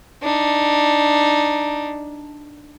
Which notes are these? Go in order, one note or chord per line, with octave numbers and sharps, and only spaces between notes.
D4 D#4